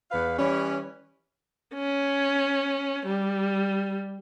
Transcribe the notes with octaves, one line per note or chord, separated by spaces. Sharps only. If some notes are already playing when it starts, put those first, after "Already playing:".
E2 B4 F5
E3 G3 C#4
C#4
G3